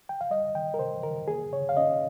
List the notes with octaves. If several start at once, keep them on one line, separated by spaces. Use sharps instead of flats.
G5
F5
G3 D#5
D#3 G5
A#4
C3 C5
D#3 A#4
A#3 G#4
C#3 C#5
F5
C#4 D#5